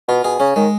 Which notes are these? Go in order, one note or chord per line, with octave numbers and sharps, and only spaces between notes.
B2 F4
B2 G#4
C#3 C#4
D#3 G#3